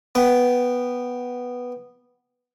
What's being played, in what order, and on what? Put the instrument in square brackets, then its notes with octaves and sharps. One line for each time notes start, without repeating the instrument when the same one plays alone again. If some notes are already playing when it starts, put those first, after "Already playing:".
[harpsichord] B3 G5